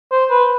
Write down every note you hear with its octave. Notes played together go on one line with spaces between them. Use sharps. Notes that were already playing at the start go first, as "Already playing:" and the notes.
C5
B4